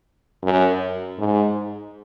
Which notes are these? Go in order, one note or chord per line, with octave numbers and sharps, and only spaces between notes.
F#2
G#2